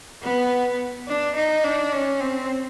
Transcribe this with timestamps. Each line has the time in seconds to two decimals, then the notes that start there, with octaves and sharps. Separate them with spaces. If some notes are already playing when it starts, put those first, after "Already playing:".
0.23 B3
1.08 D4
1.36 D#4
1.64 D4
1.93 C#4
2.21 C4